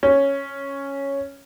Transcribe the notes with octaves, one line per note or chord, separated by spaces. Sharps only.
C#4